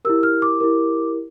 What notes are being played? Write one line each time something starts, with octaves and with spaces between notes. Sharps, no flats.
E4 G4 A#4 E6
F6
D6
E4 G4 A#4